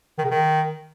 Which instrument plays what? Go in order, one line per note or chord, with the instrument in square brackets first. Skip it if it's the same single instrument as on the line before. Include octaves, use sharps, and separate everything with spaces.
[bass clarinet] D#3
C#3
D#3